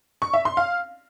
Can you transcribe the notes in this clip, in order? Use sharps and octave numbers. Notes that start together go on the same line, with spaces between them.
C#6
E5
C6
F5